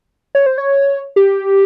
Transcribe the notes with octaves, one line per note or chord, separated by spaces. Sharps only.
C#5
C5
C#5
G4